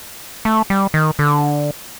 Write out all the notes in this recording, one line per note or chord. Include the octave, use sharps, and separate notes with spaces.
A3
G3
D#3
D3